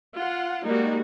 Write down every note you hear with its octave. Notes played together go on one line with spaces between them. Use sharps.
F4 F#5
G3 G#3 A#3 D#4 F#4